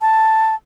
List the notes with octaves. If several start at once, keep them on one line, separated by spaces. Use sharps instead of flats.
A5